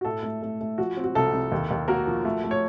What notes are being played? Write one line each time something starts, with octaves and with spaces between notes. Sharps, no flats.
F#4
A2 A4
A3
A3
A3
F3 F#4
C4
F#4
C2 A4
C2
D#2
D#2
A#3 F#4 A#4
F3
A3
A3
C#5